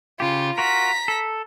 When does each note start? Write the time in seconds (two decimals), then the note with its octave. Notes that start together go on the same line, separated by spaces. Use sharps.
0.20 C#3 F4 G4
0.58 F4 F#4 A#4 A#5 B6
1.08 A4